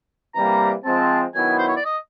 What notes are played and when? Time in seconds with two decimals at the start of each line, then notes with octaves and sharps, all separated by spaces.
0.35 C3 E3 G3 A#3 A#5
0.84 F3 G#3 C4 A5
1.35 D#3 F#3 B3 E4 G#5
1.59 C5
1.68 C#5
1.76 D5
1.85 D#5